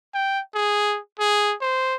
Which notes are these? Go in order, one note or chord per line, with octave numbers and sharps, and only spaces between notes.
G5
G#4
G#4
C5